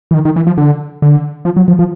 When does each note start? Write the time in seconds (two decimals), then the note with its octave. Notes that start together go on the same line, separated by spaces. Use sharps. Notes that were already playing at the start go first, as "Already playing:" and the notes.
0.11 E3
0.14 D#3
0.25 D#3
0.36 E3
0.47 F3
0.58 D3
1.02 D3
1.45 F3
1.57 F#3
1.68 F3
1.79 F3